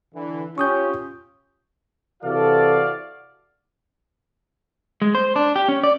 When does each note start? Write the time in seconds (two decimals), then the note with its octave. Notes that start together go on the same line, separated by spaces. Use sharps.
0.14 D3 E3
0.58 C#4 F4 G4 C#6 D#6 G6
2.23 C3 E3 F#4 A4 D5 F5
5.02 G#3
5.15 C5
5.36 D4
5.56 G4
5.68 C#4
5.84 D5